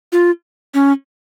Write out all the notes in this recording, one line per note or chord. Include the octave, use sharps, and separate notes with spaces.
F4
C#4